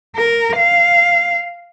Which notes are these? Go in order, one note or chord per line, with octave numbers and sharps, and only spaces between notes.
A#4
F5